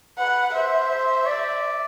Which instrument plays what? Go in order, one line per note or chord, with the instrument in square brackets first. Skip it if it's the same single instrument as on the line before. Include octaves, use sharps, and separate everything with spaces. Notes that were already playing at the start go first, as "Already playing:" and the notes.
[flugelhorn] B4 [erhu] F#5
[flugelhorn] C5 [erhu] E5
[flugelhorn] C5
D5